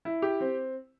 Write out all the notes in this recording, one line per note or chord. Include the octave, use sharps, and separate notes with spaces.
E4
G4
C4